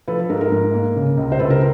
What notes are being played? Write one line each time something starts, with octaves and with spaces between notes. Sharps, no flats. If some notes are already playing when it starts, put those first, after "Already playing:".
F3 A4 B4
A4
G#2 A#4
A#4
G#2
A#3
C#3
C#2
C5
C#2 A4 B4
A#4 C5